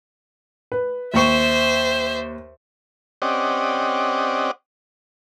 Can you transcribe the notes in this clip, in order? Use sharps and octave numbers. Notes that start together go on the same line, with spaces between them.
B4
D#2 C5 E5 C#6
C4 C#4 G4 D5 D#5 F#5